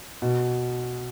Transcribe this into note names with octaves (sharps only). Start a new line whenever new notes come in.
B2